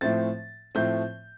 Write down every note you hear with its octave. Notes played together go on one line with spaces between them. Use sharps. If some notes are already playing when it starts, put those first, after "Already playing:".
A2 F3 A3 C4 A6
A2 F3 A3 C4 G6